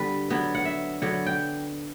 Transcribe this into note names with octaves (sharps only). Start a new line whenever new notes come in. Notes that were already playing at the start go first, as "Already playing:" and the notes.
Already playing: D3 G3 B3 B4
D3 F#3 B3
F#5
E5
D3 F#3 B3 F#5
G5